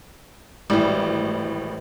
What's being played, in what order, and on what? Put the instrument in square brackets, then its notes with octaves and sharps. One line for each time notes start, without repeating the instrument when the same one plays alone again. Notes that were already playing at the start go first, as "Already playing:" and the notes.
[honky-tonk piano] G#1 A2 [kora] E3 G3